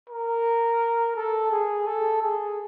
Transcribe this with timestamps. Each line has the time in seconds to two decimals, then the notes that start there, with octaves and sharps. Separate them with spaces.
0.10 A#4
1.16 A4
1.52 G#4
1.87 A4
2.22 G#4